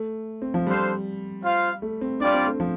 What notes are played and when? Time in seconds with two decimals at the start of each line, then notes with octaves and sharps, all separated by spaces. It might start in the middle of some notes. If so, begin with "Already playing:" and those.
Already playing: A3
0.42 C4
0.54 F3
0.67 G3 D4 A4 C5 F5
1.43 F4 C5 F5
1.82 A3
2.01 C4
2.20 G3 D4 F4 D5
2.33 C4
2.46 A3
2.60 F3